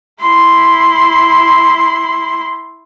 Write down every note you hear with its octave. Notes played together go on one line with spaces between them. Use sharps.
E4 C6